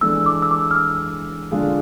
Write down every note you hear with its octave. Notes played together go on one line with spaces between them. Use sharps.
E3 G#3 D4 A4 E6
D6
E6
D6
F6
E6
D3 G#3 D4 F4 G#4